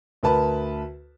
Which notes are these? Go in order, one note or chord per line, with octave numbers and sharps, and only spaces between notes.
D2 A#4 B4 A5